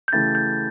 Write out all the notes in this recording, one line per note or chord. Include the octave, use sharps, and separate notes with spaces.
G6
C#3 E3 A3 E4 G4 A6
G6